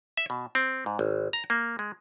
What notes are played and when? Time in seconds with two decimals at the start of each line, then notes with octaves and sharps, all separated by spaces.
0.17 E5
0.30 B2
0.55 C4
0.86 G#2
0.99 G#1
1.33 A#5
1.50 A#3
1.79 G#3